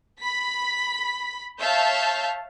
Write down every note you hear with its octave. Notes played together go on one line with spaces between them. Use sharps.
B5 B6
C#5 E5 F5 A5 G6